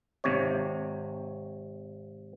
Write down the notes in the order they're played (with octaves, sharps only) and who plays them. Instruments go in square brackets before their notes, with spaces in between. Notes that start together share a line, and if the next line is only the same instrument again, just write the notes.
[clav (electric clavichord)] G#1 C3 C#5